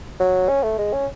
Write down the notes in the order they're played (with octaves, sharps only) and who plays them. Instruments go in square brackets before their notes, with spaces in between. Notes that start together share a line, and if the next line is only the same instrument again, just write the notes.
[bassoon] F#3
C#4
A3
G#3
C#4